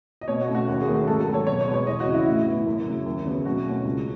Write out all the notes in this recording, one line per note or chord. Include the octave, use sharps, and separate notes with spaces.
D#5
B2 C#5
F#4
A3 C#4
F#4
D#2 F#4
G#4
D#3 A3 C#4
F#4
G#2 A4
A4
D#3 F#3
C#5
B2 C#5
C#5
G#3 B3
C#5
E2 D#5
F#4
C#3
E3 E4
A2 E4
E3 B3
F#2
C#3 F#3
D#2
C#3 F#3 B3
B2 F#4
A3 C#4
C#2